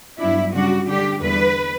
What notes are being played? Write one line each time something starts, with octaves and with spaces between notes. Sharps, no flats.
G2 F#3 B3 D4 E4
C#3 G3 D4 F#4
D3 G3 D4 G4
E2 D3 G3 B3 B4